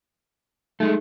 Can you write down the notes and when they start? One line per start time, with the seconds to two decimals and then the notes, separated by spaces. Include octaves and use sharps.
0.80 G#3 A3 D#4